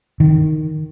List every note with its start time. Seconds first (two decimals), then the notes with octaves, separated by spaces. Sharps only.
0.20 D#3